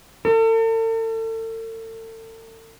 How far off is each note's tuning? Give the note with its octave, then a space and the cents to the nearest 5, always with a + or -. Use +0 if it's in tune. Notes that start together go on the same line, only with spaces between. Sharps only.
A4 +40